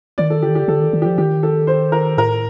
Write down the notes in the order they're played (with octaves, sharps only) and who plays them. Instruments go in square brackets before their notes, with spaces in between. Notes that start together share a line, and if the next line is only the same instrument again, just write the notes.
[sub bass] D#3 [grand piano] D5
[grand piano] A4
[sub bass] D3 [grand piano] G4
[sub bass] D#3
[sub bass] D3 [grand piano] G4
[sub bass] D3 [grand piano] A4
[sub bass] D#3
D#3
[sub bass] F3 [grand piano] G4
[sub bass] D#3 [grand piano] G4
[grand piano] A4
C5
A#4
[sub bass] A2 [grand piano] A#4